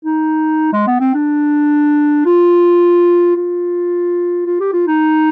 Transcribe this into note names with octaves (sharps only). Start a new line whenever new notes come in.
D#4
G#3
B3
C4
D4
F4
F4
F4
G4
F4
D#4